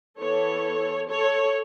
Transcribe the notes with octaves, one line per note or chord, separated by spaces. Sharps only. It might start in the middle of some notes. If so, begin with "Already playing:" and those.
E3 B3 A4 C#5
A4 C#5